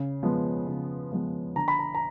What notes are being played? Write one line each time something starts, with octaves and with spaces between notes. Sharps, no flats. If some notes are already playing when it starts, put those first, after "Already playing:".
Already playing: C#3
F3 G#3 B3
C#3
F3 G#3 B3
D3 A#5
B5
A#5
A#5